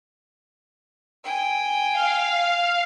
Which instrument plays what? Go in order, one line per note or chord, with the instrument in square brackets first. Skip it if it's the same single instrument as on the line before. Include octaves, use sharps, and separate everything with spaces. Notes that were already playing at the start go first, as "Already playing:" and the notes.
[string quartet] G5 G#5
[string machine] F5